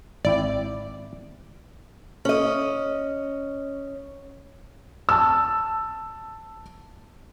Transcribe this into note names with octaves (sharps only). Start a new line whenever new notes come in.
G#1 E4 D5 G5
C#4 D#5
A5 E6